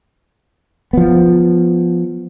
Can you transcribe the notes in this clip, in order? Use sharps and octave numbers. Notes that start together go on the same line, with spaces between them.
F3 B3